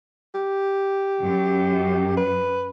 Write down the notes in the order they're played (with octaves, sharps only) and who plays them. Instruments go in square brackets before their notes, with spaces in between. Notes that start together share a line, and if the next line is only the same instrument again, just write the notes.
[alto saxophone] G4
[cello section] F#2
[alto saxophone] B4